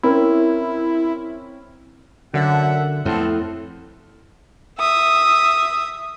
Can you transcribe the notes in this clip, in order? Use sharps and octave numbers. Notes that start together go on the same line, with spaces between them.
C4 C#4 E4 A#4
F#2 D3 E5 F#5
F2 A2 B3 C4 A4
E5 D#6